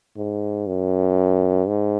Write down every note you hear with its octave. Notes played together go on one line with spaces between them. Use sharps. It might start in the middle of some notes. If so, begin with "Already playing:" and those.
G#2
F#2
G#2